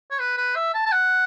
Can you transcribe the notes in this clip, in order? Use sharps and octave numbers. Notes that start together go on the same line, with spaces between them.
C#5
B4
B4
E5
A5
A5
F#5